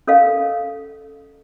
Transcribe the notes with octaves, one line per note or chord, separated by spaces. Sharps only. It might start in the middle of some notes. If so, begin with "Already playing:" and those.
C#4 A4 A#4 D#5 F5